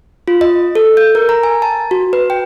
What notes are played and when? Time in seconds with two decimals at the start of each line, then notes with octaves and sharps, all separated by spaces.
0.28 F4
0.41 D#5
0.75 A4
0.97 G6
1.15 A#4
1.29 A#5
1.43 G#5
1.62 A5
1.91 F#4
2.13 B4
2.30 G5